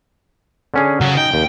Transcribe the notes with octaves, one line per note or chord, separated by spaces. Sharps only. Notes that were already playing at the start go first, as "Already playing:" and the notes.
D3 C#4 G#4
C#3 F#3
D#4 G5
D#2